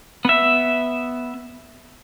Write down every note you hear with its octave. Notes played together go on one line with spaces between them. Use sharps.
B3 E5